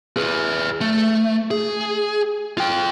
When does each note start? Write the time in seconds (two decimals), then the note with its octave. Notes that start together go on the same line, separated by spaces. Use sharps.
0.17 G#4 B4
0.81 A3
1.51 G#4
2.58 F4 G5